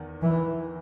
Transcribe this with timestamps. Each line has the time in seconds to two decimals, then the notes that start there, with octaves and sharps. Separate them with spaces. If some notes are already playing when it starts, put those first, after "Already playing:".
Already playing: E2 D#3
0.22 E3